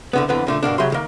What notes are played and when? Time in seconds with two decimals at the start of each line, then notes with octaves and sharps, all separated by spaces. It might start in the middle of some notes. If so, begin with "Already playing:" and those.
0.13 C2 D3 B3
0.29 F2 D3 E3 B3 D4
0.47 A#2 D3 A3
0.63 G2 B2 A#3 D4
0.78 C#3 F#3 G4 E5 C6
0.90 A2 D#3 A#3